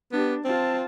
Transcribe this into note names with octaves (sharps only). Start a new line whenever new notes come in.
B3 D4 G4
C4 F4 A5